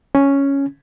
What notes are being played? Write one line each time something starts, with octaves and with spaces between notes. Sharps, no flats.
C#4